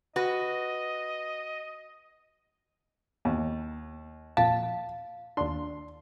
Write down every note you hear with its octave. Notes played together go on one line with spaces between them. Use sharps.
F#4 B4 D#5
D#2
F2 A#2 F5 A5
D#2 D4 C6